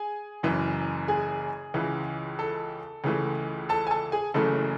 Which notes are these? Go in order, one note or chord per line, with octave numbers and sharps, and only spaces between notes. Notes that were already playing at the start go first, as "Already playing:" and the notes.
Already playing: G#4 G#5
F#1 F#2 E3
G#4 G#5
C#2 C#3 E3
A4 A5
C#2 C#3 E3 A3
A4 A5
G#5
A4 A5
G#4 G#5
F#1 F#2 C#3 E3 A3 A4 A5